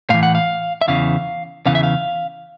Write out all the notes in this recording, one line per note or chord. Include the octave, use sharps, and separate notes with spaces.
A2 E3 F5
F#5
F5
E5
E2 C#3 E3 F5
E2 C#3 E3 F5
E5
F5